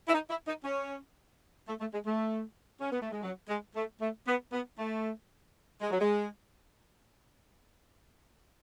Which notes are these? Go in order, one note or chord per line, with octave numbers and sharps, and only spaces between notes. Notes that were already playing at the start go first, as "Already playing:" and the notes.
E4
D#4
E4
D#4
C#4
A3
A3
G#3
A3
C#4
B3
A3
G#3
F#3
G#3
A3
A3
B3
B3
A3
G#3
F#3
G#3